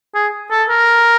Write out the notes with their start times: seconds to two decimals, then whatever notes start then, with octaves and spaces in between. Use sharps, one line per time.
0.15 G#4
0.51 A4
0.69 A#4